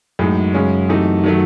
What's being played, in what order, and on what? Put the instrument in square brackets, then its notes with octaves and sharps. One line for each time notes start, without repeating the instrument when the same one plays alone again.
[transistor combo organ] F#2 [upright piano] A2 G#3 D#4
[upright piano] C#3 G#3 C#4
C3 E3 A3 D#4
D#3 F#3 A3